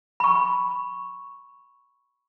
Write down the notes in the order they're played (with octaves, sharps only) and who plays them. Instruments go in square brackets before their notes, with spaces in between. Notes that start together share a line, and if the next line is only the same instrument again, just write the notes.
[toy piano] B5 C#6